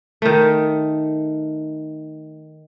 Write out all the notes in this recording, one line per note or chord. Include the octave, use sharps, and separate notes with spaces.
D#3 A3